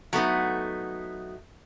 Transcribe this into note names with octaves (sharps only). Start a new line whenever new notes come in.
F#3 A3 B3 D#4